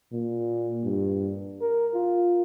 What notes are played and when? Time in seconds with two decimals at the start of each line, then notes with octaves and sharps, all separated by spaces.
0.12 A#2
0.84 G2
1.61 A#4
1.94 F4